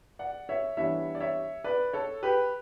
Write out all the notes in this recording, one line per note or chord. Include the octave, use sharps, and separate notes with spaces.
D5 F#5
C#5 E5
E3 G3 B3 D4 C#5 E5
D5
C#5 E5
B4 D5
A4 C#5
G4 B4